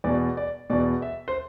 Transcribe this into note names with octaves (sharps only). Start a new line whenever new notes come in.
E2 B2 D5
D5
E2 B2 D5
E5
C5